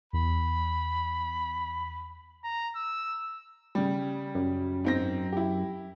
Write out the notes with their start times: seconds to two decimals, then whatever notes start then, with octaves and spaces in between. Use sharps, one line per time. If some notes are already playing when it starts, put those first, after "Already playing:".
0.13 E2 B5
2.44 A#5
2.76 E6
3.75 C#3 G3
4.35 F#2
4.85 G#2 C4 A#6
5.32 E4 G4